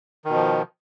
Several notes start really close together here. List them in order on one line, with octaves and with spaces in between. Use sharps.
D#3 B2 F3